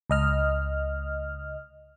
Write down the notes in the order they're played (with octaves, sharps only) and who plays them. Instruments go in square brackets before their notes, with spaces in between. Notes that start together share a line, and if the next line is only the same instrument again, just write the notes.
[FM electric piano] C#2 D#5 F6